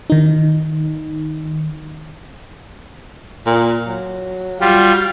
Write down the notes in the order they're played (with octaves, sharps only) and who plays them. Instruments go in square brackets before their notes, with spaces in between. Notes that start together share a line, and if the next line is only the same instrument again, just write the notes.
[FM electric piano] D#3 D#4
[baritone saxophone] A#2
F#3
[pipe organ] G3 F4 [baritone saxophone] F#4